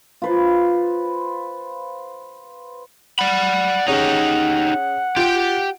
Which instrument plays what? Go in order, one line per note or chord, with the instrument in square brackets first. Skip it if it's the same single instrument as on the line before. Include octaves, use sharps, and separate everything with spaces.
[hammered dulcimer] F4 B4 C5
[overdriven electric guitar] D5 B5 [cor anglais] F#5
[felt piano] C#4 G#4 C#5 [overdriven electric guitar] D#4 G4 [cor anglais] F#5
[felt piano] F4 D7 [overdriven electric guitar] G4 G5